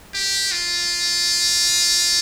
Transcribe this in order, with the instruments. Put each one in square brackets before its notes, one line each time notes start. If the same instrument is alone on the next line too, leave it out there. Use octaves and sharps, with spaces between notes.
[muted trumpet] G4
F4